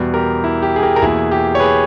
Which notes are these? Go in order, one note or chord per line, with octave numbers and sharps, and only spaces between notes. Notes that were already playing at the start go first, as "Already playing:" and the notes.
Already playing: E2 B2 G3 B3
G4 A#4
E4
G4
G#4
G4 A#4
A#4
E2 B2 A#3 E4 G#4
G4
C#5
G#4 B4